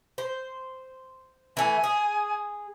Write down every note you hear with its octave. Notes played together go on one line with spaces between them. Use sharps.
C5
E3 A3 G#5
G#4